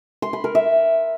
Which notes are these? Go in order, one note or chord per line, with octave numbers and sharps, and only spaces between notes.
C6
B5
A#4
E5